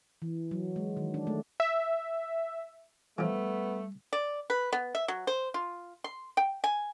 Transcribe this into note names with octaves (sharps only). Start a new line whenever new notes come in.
E3
F#3
G#3
D#3
D4
A3
E5
E3 F3 G3 A3 B3
D5
B4
B3
E5
F#3
C5
F4
C6
G5
G#5